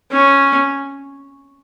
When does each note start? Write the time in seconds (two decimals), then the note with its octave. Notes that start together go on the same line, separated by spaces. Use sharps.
0.11 C#4